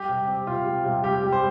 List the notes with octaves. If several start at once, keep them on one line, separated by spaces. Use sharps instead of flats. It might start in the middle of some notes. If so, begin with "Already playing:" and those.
Already playing: G3 G4
C3
C4
C3 F4
G3
C3
G3 G4
G3
C5